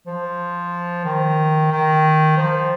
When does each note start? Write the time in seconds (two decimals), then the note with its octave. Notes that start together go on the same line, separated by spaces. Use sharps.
0.07 F3
1.05 D#3
1.71 D#3
2.37 F3